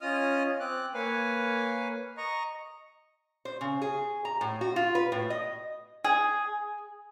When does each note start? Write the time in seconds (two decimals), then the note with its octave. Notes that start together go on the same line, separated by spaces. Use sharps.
0.01 C#4 F4 D#5 D#6 F6
0.60 C4 D6 F#6
0.94 A#3 B4 C#5 F5 G#5
2.17 D#5 A#5 C#6
3.45 C5
3.61 C#3
3.82 G#4
4.25 A#5
4.41 A2
4.61 F#4
4.76 F4
4.95 B4
5.12 A2
5.30 D#5
6.04 G#4